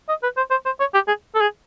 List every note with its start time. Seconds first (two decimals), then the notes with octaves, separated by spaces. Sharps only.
0.09 D#5
0.23 B4
0.37 C5
0.51 C5
0.65 C5
0.80 C#5
0.94 G4
1.07 G#4
1.35 A4
1.41 G#4